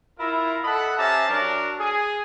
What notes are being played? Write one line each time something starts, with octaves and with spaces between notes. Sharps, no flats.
E4 F4 A#4
A4 D#5 F#5 B5
C#4 G4 C5 E5 A5 A#5
F#3 D4 A#4
G#4